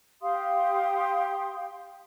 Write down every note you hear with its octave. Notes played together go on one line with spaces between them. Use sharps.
G4 F5 C6 D#6